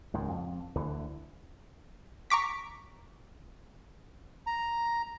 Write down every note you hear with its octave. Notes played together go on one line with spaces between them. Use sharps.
C#2 G#2 D#3
F2
D2 D3 E3
A#5 C#6 D6 B6
A#5